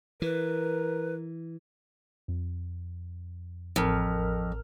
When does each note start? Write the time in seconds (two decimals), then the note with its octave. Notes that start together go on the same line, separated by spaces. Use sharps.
0.22 E3 A#4 B4
2.28 F2
3.76 A1 F2 A#4 F6